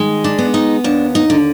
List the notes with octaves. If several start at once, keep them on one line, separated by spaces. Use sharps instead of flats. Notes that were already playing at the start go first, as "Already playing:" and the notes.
Already playing: D#3 G#3
D4
B3
D#4
D#2 D4
D#4
D3